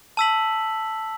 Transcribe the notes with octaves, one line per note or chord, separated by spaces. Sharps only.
A5 E6 B6 F#7